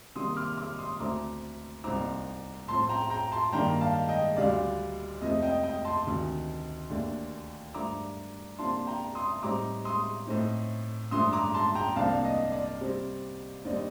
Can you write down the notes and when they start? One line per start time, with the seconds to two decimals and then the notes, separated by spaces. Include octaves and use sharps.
0.15 C3 D#3 G3 A#3 C6 D#6
0.36 D6 F6
0.57 D6 F6
0.78 C6 D#6
1.00 D2 D3 A3 C4 A#5 D6
1.84 C2 A#2 F3 C4 D#4 A#5 D6
2.68 A2 F3 C4 A5 C6
2.89 G5 A#5
3.10 G5 A#5
3.32 A5 C6
3.53 G2 D#3 A#3 D4 G5 A#5
3.81 F5 A5
4.09 D#5 G5
4.37 D2 D3 G3 D4 D5 F5
5.21 F2 C3 F3 A3 D#5
5.42 D#5 G5
5.63 D#5 G5
5.84 A5 C6
6.06 D2 C3 D#3
6.90 D#2 D3 A3 D4
7.74 G2 F3 A3 D4 A#5 D6
8.58 C3 F3 A#3 D4 A5 C6
8.87 G5 A#5
9.15 C6 D#6
9.43 A2 G3 C4 D#4 A#5 D6
9.85 C6 D#6
10.27 A2 A3 C4 D#4
11.11 G2 D3 F3 A3 C6 D#6
11.33 A#5 D6
11.54 A5 C6
11.75 G5 A#5
11.96 C2 C3 F3 A#3 D4 F5 A5
12.24 D#5
12.52 D5
12.80 C3 G3 C4
13.65 D#2 D3 G3 C4 D#4 D5